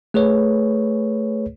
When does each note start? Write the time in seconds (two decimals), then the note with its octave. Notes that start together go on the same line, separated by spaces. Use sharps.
0.14 A3 G#4 B4 C#5